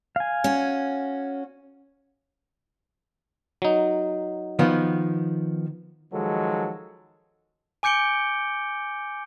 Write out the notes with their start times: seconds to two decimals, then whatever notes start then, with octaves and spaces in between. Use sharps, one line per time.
0.16 F5 G#5
0.44 C#4 F#4
3.62 F#3 D#4
4.59 D#3 F3 B3
6.12 D#3 F3 F#3 G#3 A4
7.83 G#5 D6 G6 C#7 D7 G7